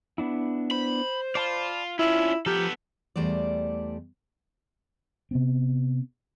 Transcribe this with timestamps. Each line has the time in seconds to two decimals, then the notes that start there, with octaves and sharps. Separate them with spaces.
0.18 B3 D4 E4
0.71 C5 B5
1.35 F4 D5 A5 B5
1.99 C#4 D4 E4 F4
2.46 F3 B3 G4 A4 A#5 F6
3.16 E2 G3 A3 C5 D5
5.31 C3 B3 C4